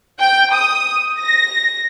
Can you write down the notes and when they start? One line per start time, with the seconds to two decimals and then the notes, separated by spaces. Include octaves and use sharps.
0.20 G5
0.54 D#6
1.20 A#6